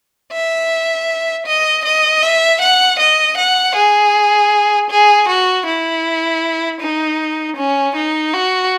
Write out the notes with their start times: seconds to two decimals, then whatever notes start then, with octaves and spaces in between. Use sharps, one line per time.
0.33 E5
1.46 D#5
1.85 D#5
2.23 E5
2.61 F#5
2.99 D#5
3.38 F#5
3.76 G#4
4.90 G#4
5.29 F#4
5.66 E4
6.81 D#4
7.57 C#4
7.96 D#4
8.33 F#4